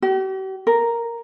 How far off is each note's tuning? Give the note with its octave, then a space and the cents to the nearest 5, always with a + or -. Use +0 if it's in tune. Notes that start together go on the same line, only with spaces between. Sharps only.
G4 -45
A#4 +0